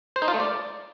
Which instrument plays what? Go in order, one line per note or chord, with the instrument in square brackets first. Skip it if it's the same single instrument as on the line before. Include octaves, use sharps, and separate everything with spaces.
[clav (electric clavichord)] C5
D#4
F4
A3
D5